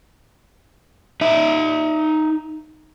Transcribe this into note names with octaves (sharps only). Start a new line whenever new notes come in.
D#4 E5